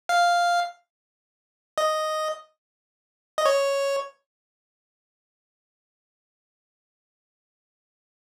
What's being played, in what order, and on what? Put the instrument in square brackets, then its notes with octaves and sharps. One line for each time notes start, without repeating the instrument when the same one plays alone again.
[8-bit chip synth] F5
D#5
D#5
C#5